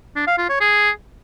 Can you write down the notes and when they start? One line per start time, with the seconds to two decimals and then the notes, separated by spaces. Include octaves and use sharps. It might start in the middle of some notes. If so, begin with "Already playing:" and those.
0.16 D4
0.27 F5
0.38 F4
0.49 C#5
0.60 G#4